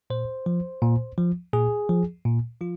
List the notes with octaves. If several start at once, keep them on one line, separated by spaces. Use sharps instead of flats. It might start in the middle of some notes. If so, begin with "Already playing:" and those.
A#2 C5
F3
A#2
F3
A#2 G#4
F3
A#2
F3 F4